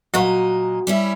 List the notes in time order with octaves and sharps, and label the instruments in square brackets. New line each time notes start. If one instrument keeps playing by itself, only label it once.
[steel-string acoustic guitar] A#2 F#3 D#5 [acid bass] F#4
[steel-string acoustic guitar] G3 C#4 E4